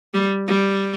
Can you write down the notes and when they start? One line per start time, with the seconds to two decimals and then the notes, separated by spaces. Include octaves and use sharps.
0.14 G3
0.47 G3